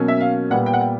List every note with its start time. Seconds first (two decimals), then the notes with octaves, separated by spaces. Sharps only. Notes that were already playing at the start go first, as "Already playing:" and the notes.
Already playing: B2 F#3 A#3 C#4
0.08 E5
0.21 F5
0.50 A#2 G3 B3 F#5
0.66 G5
0.74 F#5
0.81 G5